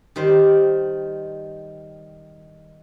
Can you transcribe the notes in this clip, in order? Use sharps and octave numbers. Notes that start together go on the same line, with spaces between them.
D#3 G3 C5